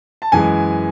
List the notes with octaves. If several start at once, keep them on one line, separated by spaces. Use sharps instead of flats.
A5
F#2 E3 G#3 G#5